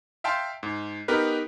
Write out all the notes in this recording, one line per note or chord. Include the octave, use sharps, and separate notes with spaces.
E5 F5 G5 A5 C6
G#2
B3 D#4 G4 A#4 B4